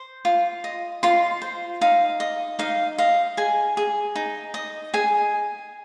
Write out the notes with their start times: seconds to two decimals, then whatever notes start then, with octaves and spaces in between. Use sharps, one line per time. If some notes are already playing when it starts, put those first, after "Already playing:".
Already playing: C5
0.25 F4
0.64 D#5
1.03 F4 C6
1.42 C5
1.81 D#4 F5
2.20 D#5
2.59 D#4 F5
2.98 D#5 F5
3.37 G#4 G#5
3.77 G#4
4.16 D#4
4.54 D#5
4.94 G#4 G#5